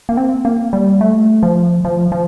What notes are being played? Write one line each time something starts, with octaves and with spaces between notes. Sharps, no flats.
A#3
C4
A#3
G3
A3
F3
F3
F3